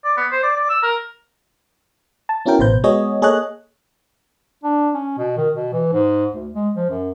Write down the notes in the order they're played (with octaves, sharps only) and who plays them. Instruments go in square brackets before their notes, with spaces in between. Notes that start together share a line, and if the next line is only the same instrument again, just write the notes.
[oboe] D5
B3
C5
D5
D5
E6
A#4
[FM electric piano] A5
B3 C#4 E4 F#4 A#4 G5
A1 B2 B4 C5 G6
G#3 B3 F#4 G#4 C#5 D#5
A#3 G#4 A4 C#5 D#5 F#6
[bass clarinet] D4
C#4
B2
D#3
B2
E3
G#2
D2
G#3
F3
F#2